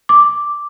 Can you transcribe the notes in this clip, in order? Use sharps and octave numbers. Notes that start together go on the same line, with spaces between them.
D6